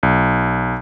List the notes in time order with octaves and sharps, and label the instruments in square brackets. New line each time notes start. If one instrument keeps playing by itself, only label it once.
[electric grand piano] B1